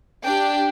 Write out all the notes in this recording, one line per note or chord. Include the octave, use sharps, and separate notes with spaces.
D4 G4 G5